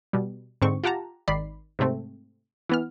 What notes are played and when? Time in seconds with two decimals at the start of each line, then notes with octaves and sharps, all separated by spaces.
0.13 B2 G3
0.62 G#2 D3 C4 C#6
0.84 F4 G4 F#5 A5 A#5
1.28 G#1 D#3 D5 B5 C7
1.79 G#2 C3 A3 C4
2.69 E3 B3 F6